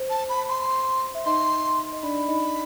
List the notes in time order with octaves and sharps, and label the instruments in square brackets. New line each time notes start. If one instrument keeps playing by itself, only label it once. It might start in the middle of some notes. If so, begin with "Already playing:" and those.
Already playing: [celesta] C5
[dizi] A5
B5
C6
[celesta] E5
[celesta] D#4 D#5 [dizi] C6
[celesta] D#5
[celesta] D4 D5 [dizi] B5
[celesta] D#4 D#5